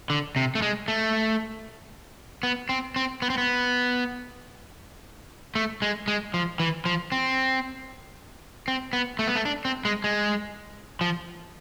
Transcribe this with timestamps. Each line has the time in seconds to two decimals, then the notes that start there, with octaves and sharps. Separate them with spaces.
0.10 D3
0.36 C3
0.55 A3
0.62 G#3
0.88 A3
2.43 B3
2.69 C4
2.96 C4
3.22 B3
3.30 C4
3.38 B3
5.55 A3
5.82 G#3
6.08 G#3
6.34 F3
6.60 E3
6.86 F3
7.12 C4
8.68 C4
8.93 B3
9.19 A3
9.27 B3
9.35 A3
9.45 D4
9.65 C4
9.85 G#3
10.04 G#3
11.01 F3